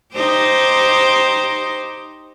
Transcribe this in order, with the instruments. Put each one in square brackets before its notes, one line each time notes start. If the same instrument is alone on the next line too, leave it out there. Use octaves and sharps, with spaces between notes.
[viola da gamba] D#4 G4 C5